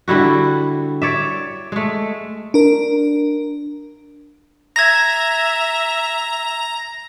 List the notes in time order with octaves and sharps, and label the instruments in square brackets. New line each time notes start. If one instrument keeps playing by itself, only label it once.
[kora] D3 G3 E4 F#4
C#5 D5 E5
G#3 A3
[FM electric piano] D4 A#4
[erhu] E5 [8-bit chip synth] A#5 [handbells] G#6 A#6